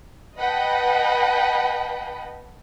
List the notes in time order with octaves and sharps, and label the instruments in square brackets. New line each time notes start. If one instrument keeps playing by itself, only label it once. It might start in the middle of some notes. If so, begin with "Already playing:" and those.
[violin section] B4 D#5 F#5 G5 A5 B5